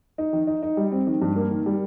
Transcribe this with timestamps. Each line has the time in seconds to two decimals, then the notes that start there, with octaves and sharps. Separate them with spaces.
0.18 D#4
0.33 D#3
0.47 D#4
0.63 D#4
0.77 G3
0.92 C4
1.07 D#3
1.22 G2
1.36 A#3
1.51 D#3
1.66 G3